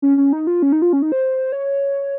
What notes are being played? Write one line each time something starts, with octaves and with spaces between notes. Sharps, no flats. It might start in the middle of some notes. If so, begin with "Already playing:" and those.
C#4
C#4
D#4
F4
C#4
D#4
F4
C#4
D#4
C5
C#5